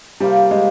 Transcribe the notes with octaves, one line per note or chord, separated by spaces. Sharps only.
C3 F3 G3 A#3
G#3